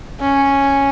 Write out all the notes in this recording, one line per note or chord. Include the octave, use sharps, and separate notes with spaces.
C#4